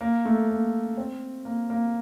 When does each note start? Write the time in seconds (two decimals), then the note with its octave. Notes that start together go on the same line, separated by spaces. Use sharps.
0.01 A#3
0.25 A3
0.49 A#3
0.97 C4
1.45 A#3
1.70 A#3